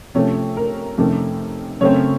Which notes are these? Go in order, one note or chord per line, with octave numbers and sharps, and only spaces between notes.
C3 F3 A3 C#4 C#5
A#4
F2 C3 D#3 A3 C#4
F#2 C#3 A3 C4 C#5